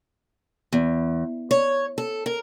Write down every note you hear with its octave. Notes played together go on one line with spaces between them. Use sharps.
E2
C#5
A4
A#4